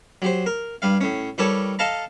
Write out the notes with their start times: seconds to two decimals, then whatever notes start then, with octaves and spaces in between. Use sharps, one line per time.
0.22 F#3 G4 C5
0.46 A#4
0.82 G2 G3 F5
1.01 A2 C#4
1.38 E3 G3 G4 A4 A#4 C#5
1.79 A4 D#5 F5 A5 A#5